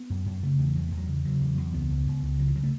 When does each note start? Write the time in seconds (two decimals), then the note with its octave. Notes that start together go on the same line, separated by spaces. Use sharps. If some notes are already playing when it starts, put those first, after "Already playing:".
Already playing: B3
0.10 F#2
0.26 F#2
0.42 C#3 A3
0.59 E2 E3
0.75 E2 F#3
0.86 A3
0.92 E2
0.97 F#3
1.08 C#3
1.25 C#3 F#3
1.41 E2
1.57 E2
1.73 C#2 B3
1.91 C#2
2.07 C#2
2.23 C#2
2.39 C#3 F#3
2.47 E3
2.55 C#3 F#3
2.64 A3